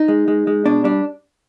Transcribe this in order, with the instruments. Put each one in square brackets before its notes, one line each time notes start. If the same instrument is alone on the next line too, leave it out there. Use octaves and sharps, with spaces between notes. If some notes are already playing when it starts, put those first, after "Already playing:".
Already playing: [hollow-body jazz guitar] D#4
G#3
G#3
G#3
B2 D4
G3 D4